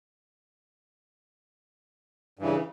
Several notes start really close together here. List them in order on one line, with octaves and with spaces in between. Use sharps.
G2 E3 C#3